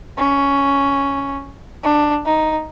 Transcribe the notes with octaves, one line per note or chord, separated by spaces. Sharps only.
C#4
D4
D#4